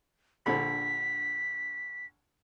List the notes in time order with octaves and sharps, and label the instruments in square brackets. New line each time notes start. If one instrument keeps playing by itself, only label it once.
[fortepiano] A#1 D3 B5 [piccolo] B6